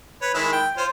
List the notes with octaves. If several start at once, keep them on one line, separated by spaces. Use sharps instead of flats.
B4 C#5
D#3 G#3 E4
G5
F4 C5 C#5